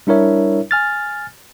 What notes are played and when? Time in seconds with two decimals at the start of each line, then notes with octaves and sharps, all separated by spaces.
0.07 G3 D4 E4 A#4 C#5 E5
0.71 G#5 F6 A6